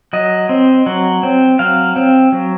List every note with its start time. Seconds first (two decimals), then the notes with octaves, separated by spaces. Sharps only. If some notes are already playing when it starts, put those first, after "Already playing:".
0.13 F#3 D#5
0.49 C4
0.86 F#3
1.23 C4
1.59 F#3 F5
1.96 C4
2.32 F#3